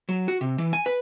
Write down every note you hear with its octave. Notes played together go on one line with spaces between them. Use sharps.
F#3
F#4
C3
E3
G#5
B4